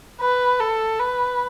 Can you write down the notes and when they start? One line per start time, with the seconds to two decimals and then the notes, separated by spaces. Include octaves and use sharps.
0.21 B4
0.60 A4
1.00 B4